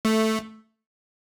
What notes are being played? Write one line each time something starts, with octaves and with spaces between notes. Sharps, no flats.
A3